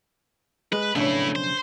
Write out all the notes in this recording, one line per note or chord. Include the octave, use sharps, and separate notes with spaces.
G#3 B4
B1 F2 C#3 A3 D4 E4 C#5
C5